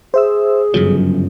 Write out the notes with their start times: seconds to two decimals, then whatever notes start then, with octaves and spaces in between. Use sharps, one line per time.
0.14 G#4 C5 E5 E6
0.74 G1 F#2 C#3 F3 F#3